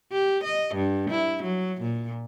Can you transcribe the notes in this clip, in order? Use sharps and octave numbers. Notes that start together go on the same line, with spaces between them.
G4
D#5
G2
E4
F#3
A#2